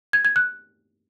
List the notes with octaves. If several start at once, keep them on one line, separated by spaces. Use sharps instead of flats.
G#6
G#6
F#6